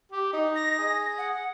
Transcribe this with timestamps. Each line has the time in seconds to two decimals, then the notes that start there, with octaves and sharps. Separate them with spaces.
0.12 G4
0.33 D#4
0.56 A#6
0.79 G#4
1.18 F#5